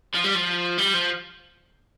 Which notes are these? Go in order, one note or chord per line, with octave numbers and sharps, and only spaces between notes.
F3
G3
F3
G3
F3